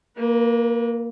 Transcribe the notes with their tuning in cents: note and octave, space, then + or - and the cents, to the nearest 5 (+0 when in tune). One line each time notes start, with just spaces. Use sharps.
A#3 +0 B4 -40